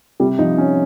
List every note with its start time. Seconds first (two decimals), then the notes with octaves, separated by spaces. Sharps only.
0.20 C3 G3
0.39 F3 D#4
0.58 F3 C#4